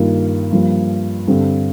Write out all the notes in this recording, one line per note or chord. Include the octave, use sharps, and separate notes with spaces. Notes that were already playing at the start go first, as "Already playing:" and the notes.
Already playing: G2 D#3 A#3 F4
G2 F3 A#3
G2 D3 G3 C4